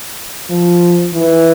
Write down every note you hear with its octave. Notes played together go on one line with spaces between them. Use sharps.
F3
E3